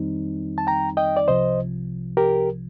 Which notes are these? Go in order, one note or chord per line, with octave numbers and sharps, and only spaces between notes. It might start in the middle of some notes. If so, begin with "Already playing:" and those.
Already playing: F2 D#3 G3 C4 D#4
A5
G5 A#5
D#5 G5
D5
C2 C3 F3 C5 D#5
G4 A#4